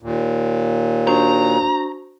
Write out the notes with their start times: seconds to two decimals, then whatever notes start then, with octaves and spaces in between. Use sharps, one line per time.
0.02 D#2 A#2
1.07 D4 F#4 C5 A#5